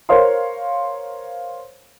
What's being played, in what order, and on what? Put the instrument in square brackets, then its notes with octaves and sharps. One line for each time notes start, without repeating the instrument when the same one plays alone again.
[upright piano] A#4 C5 C#5 F5 C6